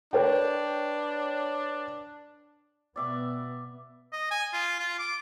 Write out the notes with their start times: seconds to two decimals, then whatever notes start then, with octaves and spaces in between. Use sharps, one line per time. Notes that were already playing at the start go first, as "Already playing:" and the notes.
0.13 D4 B4 C#5 G5
2.96 B2 B3 D5 E5 D6
4.12 D#5
4.31 G#5
4.53 F4
4.80 F4
4.99 D6